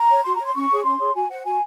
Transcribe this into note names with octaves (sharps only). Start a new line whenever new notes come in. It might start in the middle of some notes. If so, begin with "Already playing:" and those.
Already playing: A#5
C#5
F#4 C6
C#5 A#5
C6
C#4 C#6
G#4 C#5
C#4 C6
G#4 C#5
F#4 G#5
C5 F#5
F#4 G#5